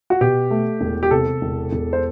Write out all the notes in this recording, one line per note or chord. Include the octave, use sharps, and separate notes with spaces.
F#4
B2 G4
A3
E1
G4
C3 A4
E1
E1
C5